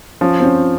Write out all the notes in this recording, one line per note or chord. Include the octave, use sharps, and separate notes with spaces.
F3 C#4
C4
C#4